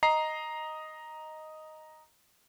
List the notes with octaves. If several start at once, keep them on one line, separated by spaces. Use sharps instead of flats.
D#5 A#5 C7